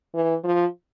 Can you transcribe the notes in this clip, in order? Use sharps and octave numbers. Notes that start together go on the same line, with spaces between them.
E3
F3